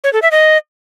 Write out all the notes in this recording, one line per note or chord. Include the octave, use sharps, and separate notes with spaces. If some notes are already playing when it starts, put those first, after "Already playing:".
C#5
A4
E5
D#5